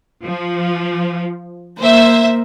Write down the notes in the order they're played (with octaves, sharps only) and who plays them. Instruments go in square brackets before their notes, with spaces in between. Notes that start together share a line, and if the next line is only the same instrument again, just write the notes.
[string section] F3
[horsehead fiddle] A#3 [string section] C5 E5